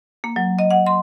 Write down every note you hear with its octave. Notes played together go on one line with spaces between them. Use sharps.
A#3
F#3
D#5
F#5
C6